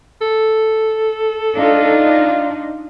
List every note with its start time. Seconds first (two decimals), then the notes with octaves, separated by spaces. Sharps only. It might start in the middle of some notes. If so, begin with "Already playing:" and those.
0.22 A4
1.57 D4 D#4 F4